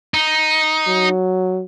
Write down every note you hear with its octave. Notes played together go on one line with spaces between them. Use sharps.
D#4
F#3